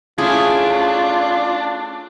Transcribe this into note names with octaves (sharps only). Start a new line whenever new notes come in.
A3 C#4 D4 E4 F4 G#4